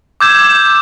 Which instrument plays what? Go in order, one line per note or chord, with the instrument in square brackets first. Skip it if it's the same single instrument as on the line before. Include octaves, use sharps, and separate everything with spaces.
[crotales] D6 E6 G6 G#6 E7